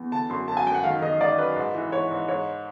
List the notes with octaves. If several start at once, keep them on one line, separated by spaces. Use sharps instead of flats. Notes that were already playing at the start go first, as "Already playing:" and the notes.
Already playing: E2
D3 A5
F#2 C6
F#2 A5
G#5
F#2 G5
F#5
D#3 F5
D#3 D#5
D#3 D5
F#2 B4
G#2
E3
G#2 C#5
G#2
G#2 C#5